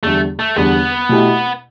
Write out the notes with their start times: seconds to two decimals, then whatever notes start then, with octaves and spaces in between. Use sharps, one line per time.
0.03 E2 D3 G3 A3
0.39 A3
0.56 E2 D3 G3 B3
1.09 B2 A3 E4 G4